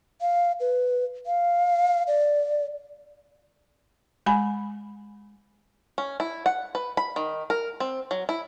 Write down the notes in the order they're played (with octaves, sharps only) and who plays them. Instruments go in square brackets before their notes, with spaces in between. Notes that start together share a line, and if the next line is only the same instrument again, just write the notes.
[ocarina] F5
B4
F5
D5
[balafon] G#3 G#5 B5
[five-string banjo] C#4
E4
F#5
B4
B5
D#3
A#4
C4
F#3
E4